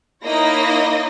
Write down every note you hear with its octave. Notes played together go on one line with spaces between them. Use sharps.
A#3 D#4 E4 C#5 D#5 A#6